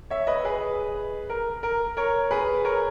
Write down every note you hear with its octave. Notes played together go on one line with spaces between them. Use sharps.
C#5 E5
B4 D#5
G#4 B4
A#4
A#4
A#4 C#5
G#4 B4
A#4 C#5